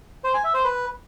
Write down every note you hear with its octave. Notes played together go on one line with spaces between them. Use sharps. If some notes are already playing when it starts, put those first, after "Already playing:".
C5
G#5
E5
C5
B4